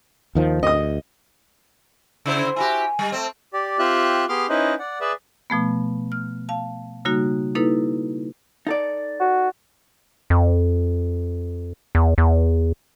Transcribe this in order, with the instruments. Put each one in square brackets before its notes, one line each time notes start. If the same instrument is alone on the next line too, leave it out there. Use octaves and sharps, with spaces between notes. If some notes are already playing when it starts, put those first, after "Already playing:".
[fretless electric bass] D#2 D#3 F3
[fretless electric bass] D2 [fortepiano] D#5 D#6
[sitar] C#3 E4 C5
[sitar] E4 F#4 G4 [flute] G#5
[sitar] G3
A3 C4
[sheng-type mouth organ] G4 D5
C4 F4 G4 E5 F#6
B3 G4 G#4 C6 D6 F6
C#4 D#4 E4 B4 C5 D#5
D5 F#5
G#4 B4 D5 E5
[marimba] B2 F3 A3 B3
F6
F5 A5
C#3 G3 A#3 D#4 F#4
A#3 D#4 E4 A4 B4
[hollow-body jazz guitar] D#4 A4 D5
[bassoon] F#4
[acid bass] F2
E2
E2